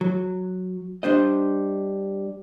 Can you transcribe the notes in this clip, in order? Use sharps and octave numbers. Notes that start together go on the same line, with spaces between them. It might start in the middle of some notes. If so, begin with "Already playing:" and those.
F#3
G3 D4 C5 D#5